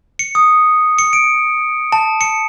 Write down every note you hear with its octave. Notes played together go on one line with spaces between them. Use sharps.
C#7
D#6
C#7
D7
A5
C#7